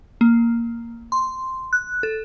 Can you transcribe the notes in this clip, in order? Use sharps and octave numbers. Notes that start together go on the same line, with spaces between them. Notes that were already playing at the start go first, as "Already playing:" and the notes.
A#3
C6
F#6
A4